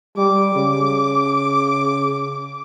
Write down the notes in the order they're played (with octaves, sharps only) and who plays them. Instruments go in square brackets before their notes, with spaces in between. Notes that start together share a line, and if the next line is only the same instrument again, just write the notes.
[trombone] G3 [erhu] D6
[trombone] C#3